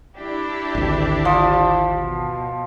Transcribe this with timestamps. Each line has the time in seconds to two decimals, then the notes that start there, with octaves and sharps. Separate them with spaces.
0.17 D4 E4 G4
0.75 G#1 D2
1.25 F3
1.88 B2